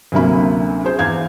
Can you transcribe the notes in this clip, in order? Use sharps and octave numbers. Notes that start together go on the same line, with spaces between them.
D2 C3 F#3 A#3 C#4 B5
G#4 C5
E2 F5 G#6